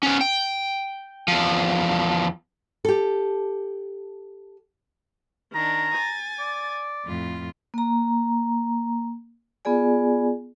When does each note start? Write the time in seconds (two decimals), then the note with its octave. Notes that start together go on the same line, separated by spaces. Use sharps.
0.03 B3 C#4
0.21 G5
1.28 E2 F3
2.85 G4 A4
5.55 D#3 D4 A#5
5.95 G#5 A6
6.39 D5
7.06 F2 A2 F4
7.74 A#3 A#5
9.65 B3 F4 G#4 D5 G#5